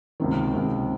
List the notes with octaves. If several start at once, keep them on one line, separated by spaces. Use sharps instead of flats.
C#2 C3 D#3
C#2 C3 D#3